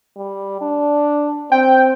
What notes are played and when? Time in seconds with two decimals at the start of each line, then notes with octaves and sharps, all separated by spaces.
0.17 G3
0.61 D4
1.52 C4 G5